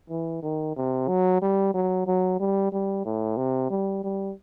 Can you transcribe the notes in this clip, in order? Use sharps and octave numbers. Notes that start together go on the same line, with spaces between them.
E3
D#3
C3
F#3
G3
F#3
F#3
G3
G3
A2
C3
G3
G3